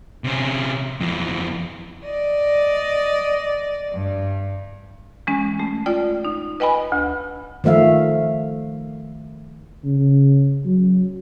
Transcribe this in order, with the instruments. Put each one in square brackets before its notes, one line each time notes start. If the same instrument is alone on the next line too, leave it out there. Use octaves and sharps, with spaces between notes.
[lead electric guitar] C3 C#4
F2 E3
[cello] D5 D#5
G2
[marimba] E3 G#3 C#4
A3
F4 D5 G5
D#4
B4 D#5 G5 G#5 B5
D2
[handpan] D#3 F3 A3 E5 F5
[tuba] C#3
F#3